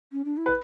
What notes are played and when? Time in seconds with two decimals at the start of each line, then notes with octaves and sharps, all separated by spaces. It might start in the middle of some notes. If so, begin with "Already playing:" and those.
0.12 C#4
0.25 D4
0.37 E4
0.46 B4